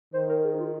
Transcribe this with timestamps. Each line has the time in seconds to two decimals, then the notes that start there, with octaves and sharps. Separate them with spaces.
0.14 D#3 C5
0.29 A#4
0.44 G#4
0.54 D#4
0.59 F4